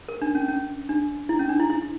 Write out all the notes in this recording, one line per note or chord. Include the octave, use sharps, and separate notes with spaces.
A#4
D4
C#4
C#4
D4
E4
C#4
D4
E4
E4